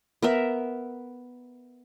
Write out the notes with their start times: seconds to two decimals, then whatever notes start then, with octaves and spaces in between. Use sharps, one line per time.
0.22 B3 A#4 E5